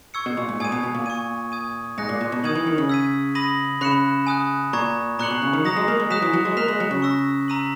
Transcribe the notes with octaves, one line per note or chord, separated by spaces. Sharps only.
C#6 E6 G#6 C#7
B2
A#2
G#2
A#2 G#5 D#6 G#6 D#7
B2
B2
A#2
C#6 G#6 D#7
D#6 G#6 D#7
G#2 F#6 A#6 C#7
A#2
A#2
B2
D#3 D#6 G#6 D#7 F#7
E3
D#3
C#3
E6 G#6 B6 D#7
B5 D#6 A#6 D#7 F#7
C#3 B5 F#6 C#7 E7
G#5 D#6 F#6
A#2 A#5 C#6 G#6
A#2 A#5 C#6 F#6 C#7 F#7
B2
C#3
D#3
F#3 A#5 D#6 A#6
G#3
A#3
G#3
F#3 D#6 F#6 B6 E7
E3
F#3
G#3
A#3 F#6 B6 E7
G#3
F#3
C#3
C#6 E6 A#6
A#5 E6 B6 D#7 F#7